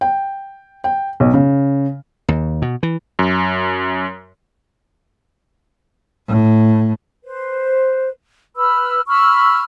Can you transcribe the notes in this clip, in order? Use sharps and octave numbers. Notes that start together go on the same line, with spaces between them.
G5
G5
B1
C#3
D#2
B2
E3
F#2
A2
B4 C5
B4 B5 E6 F6
B5 C#6 E6 F6